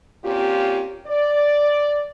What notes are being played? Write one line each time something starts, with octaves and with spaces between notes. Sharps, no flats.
A#2 C4 C#4 F4 G4
D5